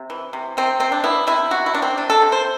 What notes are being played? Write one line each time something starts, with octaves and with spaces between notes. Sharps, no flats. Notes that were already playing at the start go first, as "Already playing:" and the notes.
Already playing: C3
E3
C3
C3 C4
C3 C4
D4
B3 E4
C3 E4
C3 F#4
E4
C3 D4
C4
C3 D4
A4
C3
C5